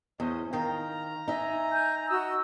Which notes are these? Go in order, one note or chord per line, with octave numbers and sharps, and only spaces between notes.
E2 C#4 C5 D#5
D#3 F5 G5 A#5
D#4 E5 G#5
G#5 G6
F#4 D#5 E6